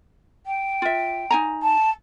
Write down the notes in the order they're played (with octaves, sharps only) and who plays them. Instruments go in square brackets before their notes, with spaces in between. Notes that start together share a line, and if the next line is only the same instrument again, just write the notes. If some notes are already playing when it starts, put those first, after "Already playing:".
[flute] G5
[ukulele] F4 E5
D#4 G#5 A#5
[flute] A5